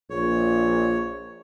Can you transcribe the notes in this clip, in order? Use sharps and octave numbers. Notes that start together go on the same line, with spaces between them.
A#1 C#5